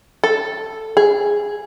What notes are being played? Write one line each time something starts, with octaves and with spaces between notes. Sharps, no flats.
A4
G#4